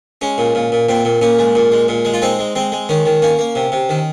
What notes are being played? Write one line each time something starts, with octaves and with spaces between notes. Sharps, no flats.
G#3 C#4
A#2
A#2
A#2
A#2 C4
A#2
A#2 C#4
G#3
A#2
G#3
A#2
G#3
F4
G#3 C4 D#4
G#3
G#3 C4
G#3
D#3 C#4
D#3
A#3 C#4
A#3
C3
C3
D#3